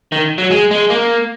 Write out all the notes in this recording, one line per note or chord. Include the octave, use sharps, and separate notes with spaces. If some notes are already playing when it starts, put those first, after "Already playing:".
D#3
F#3
G#3
G#3
A#3